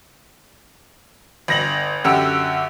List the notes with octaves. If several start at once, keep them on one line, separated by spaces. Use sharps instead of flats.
G1 A#6 F#7
F#2 D3 G4 F#5 E6